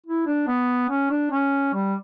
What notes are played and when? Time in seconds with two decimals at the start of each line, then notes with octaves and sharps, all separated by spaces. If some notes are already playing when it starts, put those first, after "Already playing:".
0.06 E4
0.27 D4
0.47 B3
0.89 C#4
1.11 D4
1.31 C#4
1.73 G3